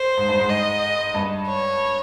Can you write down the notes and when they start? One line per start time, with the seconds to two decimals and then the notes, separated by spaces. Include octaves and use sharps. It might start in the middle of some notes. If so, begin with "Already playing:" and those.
Already playing: C5
0.17 G#2
0.28 G2
0.39 G#2
0.50 D#5
1.14 G2
1.47 C#5